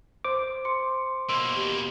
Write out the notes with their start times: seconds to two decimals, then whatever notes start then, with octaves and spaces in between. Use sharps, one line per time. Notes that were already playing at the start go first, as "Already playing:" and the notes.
0.25 C5 D6
0.65 C6 C#7
1.29 B2 A#3 C6 E6 D7
1.56 G4